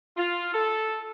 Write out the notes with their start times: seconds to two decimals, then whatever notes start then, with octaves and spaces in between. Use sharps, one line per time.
0.17 F4
0.54 A4